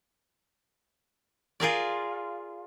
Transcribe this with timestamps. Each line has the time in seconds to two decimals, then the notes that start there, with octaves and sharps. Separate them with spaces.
1.60 F4 G#4 A#4 D5